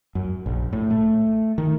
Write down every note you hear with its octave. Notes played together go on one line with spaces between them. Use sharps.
F#2
A#1
A2
A3
D#3